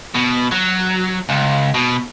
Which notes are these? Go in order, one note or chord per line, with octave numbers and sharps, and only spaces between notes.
B2
F#3
C#2
B2